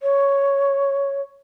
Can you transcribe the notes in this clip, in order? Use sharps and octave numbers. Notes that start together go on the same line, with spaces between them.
C#5